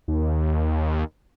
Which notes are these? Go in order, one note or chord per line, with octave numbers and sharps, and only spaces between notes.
D#2